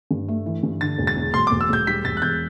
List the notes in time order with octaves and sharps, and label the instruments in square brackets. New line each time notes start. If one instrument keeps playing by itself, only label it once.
[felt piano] G2
A3
E3
G2
[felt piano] D3 [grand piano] A6
[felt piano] E1
[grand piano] A6
[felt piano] E2
[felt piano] E1 [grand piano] C6
[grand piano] D6
[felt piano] E1
[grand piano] E6
[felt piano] E1 [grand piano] G6
[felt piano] G3 [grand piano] B6
[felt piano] E1 [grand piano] A6
[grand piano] F#6
[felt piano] E2 [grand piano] G6